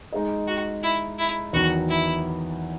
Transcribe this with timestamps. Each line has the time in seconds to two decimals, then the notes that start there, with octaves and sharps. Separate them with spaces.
0.12 G#3 D#4 G#4 D#5
0.47 F#4
0.83 E4
1.19 E4
1.53 E2 D#3 F#3 F#4
1.89 E4